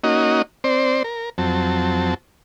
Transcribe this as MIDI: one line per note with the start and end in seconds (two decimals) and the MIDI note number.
0.04 0.42 58
0.04 0.42 61
0.04 0.42 63
0.04 0.42 66
0.04 0.42 75
0.64 1.03 60
0.64 1.03 72
0.64 1.03 74
1.04 1.30 70
1.38 2.14 41
1.38 2.14 54
1.38 2.14 60
1.38 2.14 81